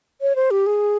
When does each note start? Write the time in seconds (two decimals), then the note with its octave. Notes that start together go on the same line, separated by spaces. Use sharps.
0.21 C#5
0.36 C5
0.51 G4
0.66 G#4